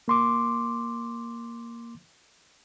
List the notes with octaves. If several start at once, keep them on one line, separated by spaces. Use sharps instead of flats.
A#3 C6 D6